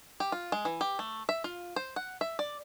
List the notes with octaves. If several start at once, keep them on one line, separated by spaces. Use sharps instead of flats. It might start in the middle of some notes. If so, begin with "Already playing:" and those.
G4
F4
G#3
E3
G4
A3
E5
F4
C5
F#5
E5
D5